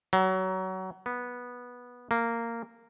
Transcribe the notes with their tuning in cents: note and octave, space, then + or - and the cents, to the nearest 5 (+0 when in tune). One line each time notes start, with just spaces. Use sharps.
F#3 +25
B3 -10
A#3 -10